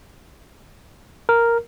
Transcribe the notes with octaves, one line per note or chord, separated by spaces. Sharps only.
A#4